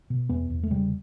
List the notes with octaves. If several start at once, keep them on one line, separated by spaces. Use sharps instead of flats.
B2
E2 B3
E2
A3
C#3 G3